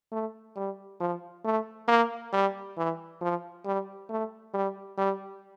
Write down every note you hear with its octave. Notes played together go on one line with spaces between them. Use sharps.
A3
G3
F3
A3
A#3
G3
E3
F3
G3
A3
G3
G3